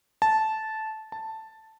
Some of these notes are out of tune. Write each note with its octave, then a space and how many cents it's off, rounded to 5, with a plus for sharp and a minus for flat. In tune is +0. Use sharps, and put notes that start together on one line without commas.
A5 -10
A5 +5